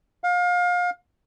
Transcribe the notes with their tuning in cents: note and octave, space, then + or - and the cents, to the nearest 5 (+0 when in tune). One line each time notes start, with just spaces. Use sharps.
F5 +30